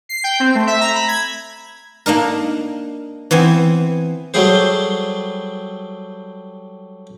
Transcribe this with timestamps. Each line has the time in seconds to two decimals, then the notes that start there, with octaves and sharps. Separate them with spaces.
0.09 C7
0.24 G5
0.40 C4
0.55 A3
0.67 E5
0.81 A#5
0.95 B5
1.08 G#6
2.06 A#3 D4 D#4 A#4
3.31 E3 B3 C4 G#5
4.34 F#3 G3 A3 G#4 C5